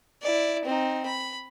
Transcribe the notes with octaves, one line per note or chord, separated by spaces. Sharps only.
E4 D5
C4 D#4
B5